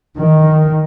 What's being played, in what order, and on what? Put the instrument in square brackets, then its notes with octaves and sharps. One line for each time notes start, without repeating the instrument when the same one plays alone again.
[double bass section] D#3